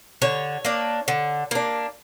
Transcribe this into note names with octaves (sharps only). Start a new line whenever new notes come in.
D3 C#5
A#3 D4
D3
A#3 D4